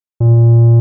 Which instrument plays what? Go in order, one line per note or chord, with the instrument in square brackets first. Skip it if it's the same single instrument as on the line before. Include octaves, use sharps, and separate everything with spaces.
[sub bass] A#2